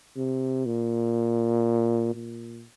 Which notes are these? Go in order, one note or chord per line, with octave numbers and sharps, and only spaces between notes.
C3
A#2
A#2